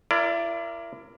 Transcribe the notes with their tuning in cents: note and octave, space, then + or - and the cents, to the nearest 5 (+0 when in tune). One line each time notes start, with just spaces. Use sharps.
E4 +35 A#4 +0 D5 +0